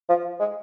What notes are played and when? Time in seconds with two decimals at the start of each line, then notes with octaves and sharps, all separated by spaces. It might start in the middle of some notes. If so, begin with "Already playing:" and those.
0.09 F3
0.40 G#3